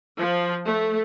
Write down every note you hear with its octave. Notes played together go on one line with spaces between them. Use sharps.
F3
A3